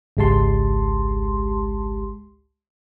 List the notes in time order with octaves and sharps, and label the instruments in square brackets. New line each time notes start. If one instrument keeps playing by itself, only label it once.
[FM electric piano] G#1 C#2 G#3 G4 A5 C6